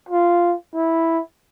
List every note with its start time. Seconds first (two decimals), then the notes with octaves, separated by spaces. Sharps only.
0.09 F4
0.75 E4